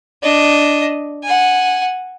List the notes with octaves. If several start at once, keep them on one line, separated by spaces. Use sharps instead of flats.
D4 D#5
F#5 G#5